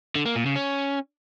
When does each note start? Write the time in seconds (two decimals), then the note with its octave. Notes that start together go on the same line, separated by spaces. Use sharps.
0.15 D3
0.26 A#3
0.36 A#2
0.46 C#3
0.56 C#4